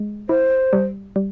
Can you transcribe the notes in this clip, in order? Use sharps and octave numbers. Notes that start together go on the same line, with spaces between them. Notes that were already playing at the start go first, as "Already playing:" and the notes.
Already playing: G#3
E4 C5
G3
G3